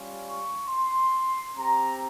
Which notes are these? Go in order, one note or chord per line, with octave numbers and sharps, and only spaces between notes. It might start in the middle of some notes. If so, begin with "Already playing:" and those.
Already playing: G3 C#4 F4
C#6
C6
C4 G4 A#5